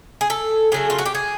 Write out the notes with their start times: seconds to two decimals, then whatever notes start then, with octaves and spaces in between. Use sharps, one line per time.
0.21 G#4
0.30 A4
0.72 C#3 F#3 A3 G#4
0.90 F4
0.99 F#4
1.06 G4
1.15 G#4